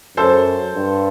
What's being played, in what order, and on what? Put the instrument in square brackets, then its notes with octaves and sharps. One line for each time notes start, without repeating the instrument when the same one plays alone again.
[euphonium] F#2 [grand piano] A4 C5
[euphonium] G2